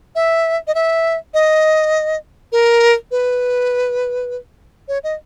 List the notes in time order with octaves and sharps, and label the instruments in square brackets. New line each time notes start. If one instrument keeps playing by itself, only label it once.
[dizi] E5
D#5
E5
D#5
A#4
B4
C#5
D#5